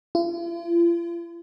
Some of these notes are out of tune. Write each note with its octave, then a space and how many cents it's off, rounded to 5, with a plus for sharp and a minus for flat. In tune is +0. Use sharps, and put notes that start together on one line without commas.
F4 -45